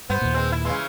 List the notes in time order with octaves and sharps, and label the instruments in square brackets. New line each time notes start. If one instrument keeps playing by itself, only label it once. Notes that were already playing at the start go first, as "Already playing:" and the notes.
[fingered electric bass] G2 [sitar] B3 [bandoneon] C5
[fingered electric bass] D#2 A#2
[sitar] G#3 C4
E4
[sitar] C#3 E3 [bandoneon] G#3 C6